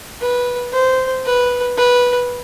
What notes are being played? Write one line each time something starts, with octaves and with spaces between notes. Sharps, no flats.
B4
C5
B4
B4